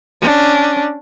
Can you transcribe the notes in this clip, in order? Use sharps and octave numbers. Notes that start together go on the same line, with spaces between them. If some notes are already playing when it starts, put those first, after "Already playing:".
C#4 D4